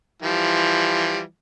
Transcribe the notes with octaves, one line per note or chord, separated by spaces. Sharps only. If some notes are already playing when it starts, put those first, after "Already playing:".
E3 F3 G3